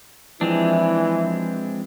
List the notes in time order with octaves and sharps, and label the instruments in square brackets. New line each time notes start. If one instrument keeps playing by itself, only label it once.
[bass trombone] E3 [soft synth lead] F3 [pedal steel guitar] G#3 C4 D4 [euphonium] E4